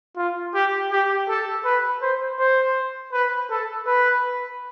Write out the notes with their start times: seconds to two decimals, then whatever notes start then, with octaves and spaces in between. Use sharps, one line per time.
0.17 F4
0.55 G4
0.92 G4
1.29 A4
1.65 B4
2.02 C5
2.40 C5
3.13 B4
3.50 A4
3.87 B4